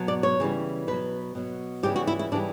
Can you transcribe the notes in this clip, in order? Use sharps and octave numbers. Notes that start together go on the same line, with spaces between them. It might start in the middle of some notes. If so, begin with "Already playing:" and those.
Already playing: B2 F#3
D5
C#5
C#3 E3 G3
B2 F#3 B4
B2 F#3
C#3 E3 G3 G4
F#4
E4
E4
C#3 E3 G3 D4